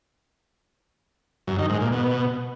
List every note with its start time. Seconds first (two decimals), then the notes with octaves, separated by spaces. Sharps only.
1.47 F#2
1.59 D#3
1.70 G#2
1.81 A#2
1.92 B2